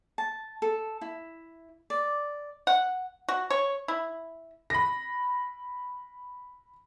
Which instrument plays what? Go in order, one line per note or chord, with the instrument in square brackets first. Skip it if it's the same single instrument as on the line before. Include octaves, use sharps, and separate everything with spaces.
[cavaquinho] A5
A4
E4
D5
[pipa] F#5
F#4
C#5
E4
[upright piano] B5 A#6